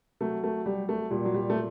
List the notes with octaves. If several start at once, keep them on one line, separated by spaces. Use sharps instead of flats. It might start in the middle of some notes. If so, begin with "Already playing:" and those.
F#3 A3
A3
F#3 G3
A3
A#2 G3
F#3
G3
A3